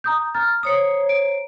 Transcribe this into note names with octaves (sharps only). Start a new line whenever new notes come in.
A#5 D#6 G6
A#5 F6 A6
C5 C#5 A#5 D#6 C#7
D7